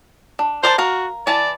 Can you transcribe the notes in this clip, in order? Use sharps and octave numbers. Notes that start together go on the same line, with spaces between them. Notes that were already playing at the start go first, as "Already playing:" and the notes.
D4
A#4 C5 D5 A5
F#4 A#4 F5
E3 D5 A5